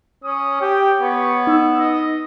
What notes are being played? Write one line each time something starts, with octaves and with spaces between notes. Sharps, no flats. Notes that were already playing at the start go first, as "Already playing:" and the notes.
C#4 D#6
G4 G5
B3 C#5
D#4 E6
D#5